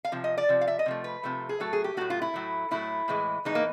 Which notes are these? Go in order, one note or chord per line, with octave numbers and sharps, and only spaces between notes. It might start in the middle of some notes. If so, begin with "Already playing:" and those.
F5
C3 F3
D#5
D5
C3 F3
F5
E5
D#5
C3 F3 A3
B4
C3 F3 A3
G#4
A2 F#3 A3 A4
G#4
G4
A2 F#3 A3 F#4
F4
E4
A2 F#3 A3
A2 F#3 A3 E4
A2 E3 G#3
A2 E3 G#3 D#4
A#3